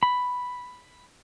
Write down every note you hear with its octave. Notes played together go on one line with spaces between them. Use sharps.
B5